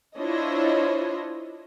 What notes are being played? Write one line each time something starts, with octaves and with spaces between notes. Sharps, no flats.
D4 E4 F4 C5 C#5 D#5